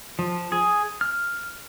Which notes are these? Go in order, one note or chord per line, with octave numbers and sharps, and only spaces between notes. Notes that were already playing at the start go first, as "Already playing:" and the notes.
F3
G#4
F6